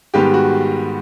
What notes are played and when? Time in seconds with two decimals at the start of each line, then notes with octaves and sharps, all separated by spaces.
0.14 G#2 D#3 G3 B3 G4
0.34 F#4